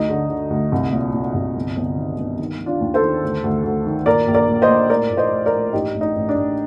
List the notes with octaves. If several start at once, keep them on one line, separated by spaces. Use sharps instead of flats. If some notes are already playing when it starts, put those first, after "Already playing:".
Already playing: D2 D#4
D3
D3
D2
C2
A#2
A#2
C2
G1
G1
D#3
G2
D#3
D#3
D4 F4
D#2
A4 C5
D#3
D2
D2
D2
D#3
A#2 A#4 D5
A#1
A#4 D5
A#2
C5 D#5
A#2
A2 A#4 D5
A#1
C5 D#5
A2
A#4 D5
A2
A1 D#4 G4
A1
D#4
A1
D4
A1